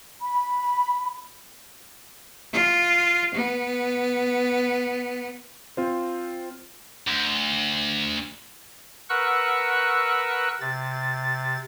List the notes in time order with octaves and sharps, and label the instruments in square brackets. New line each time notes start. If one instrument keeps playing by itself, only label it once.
[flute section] B5
[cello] F4
B3
[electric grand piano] C4 F4 C5
[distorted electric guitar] D2
[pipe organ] A#4 B4 F#5 C#6 E6 F#6
C3 A6